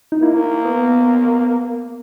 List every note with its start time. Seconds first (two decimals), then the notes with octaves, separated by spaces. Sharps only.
0.12 D#4
0.22 A#3 E4
0.37 E4
0.65 B3